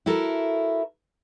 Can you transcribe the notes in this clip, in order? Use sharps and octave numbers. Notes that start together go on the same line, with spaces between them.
E4 F#4 A4 A#4